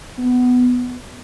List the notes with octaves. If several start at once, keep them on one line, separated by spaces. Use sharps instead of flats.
B3